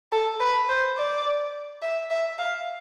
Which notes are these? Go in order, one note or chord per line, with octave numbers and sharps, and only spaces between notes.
A4
B4
C5
D5
E5
E5
F5